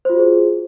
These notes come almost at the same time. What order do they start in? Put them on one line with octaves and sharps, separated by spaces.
C5 F4 F#4 G#4